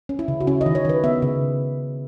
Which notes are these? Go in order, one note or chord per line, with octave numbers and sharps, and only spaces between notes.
C#4
E4
C#3
F#4
C#4 E4
D#5
D#3
C#5
D#3 B4
B3 E5
C#3